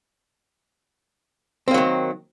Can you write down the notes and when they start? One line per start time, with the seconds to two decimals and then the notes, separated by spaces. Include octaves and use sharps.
1.68 C4
1.71 A#3
1.74 F#3
1.78 D#3